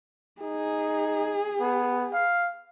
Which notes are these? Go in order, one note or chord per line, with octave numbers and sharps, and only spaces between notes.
D#4 G#4
B3
F5